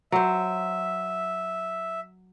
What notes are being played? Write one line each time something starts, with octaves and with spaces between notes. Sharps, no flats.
F#3 C5 E5